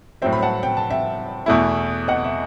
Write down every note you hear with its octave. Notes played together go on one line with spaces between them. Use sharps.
A2 F#3 C4 E5 G5
B5
F#5 A5
G5
A5
E5 G5
E2 B2 A3 E4
D#5 F#5
E5